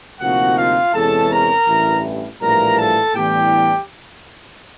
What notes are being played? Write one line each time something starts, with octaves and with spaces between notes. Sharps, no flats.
D2 C3 F3 A#3 D#4 F#4 F#5
F4 F5
E2 C3 E3 G#3 C#4 A4 A5
A#4 A#5
A1 G2 E3
A#1 A2 E3 G3 A#3 A#4 A#5
A4 A5
A2 E3 G3 B3 D4 G4 G5